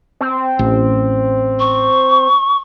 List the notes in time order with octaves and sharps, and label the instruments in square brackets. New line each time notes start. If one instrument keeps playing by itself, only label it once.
[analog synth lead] C4
[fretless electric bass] A1
[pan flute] C#6